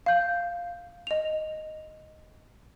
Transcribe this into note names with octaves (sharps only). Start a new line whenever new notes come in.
F5 G6
D#5 F7